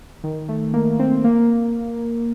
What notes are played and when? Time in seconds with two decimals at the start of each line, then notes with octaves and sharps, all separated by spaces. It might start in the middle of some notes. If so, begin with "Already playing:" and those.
0.24 D#3
0.49 A3
0.74 A#3
0.99 C4
1.24 A#3